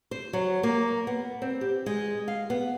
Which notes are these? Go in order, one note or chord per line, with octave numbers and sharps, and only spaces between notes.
C5
F#3
A#3
B3
C4
G4
G#3
F5
B3